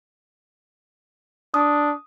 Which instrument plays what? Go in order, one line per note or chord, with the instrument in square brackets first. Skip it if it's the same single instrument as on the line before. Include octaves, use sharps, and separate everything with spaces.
[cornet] D4 [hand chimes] D#6